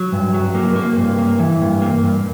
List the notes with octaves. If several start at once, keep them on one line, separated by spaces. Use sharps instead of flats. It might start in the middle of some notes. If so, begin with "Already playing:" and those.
Already playing: F#3
G2
F#3
A#3
A#3
G2
A#3
E3
G2
A#3
G2